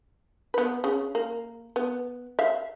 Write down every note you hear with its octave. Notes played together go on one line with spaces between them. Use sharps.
B3 B4
C#3
A#3
B3
E5 F5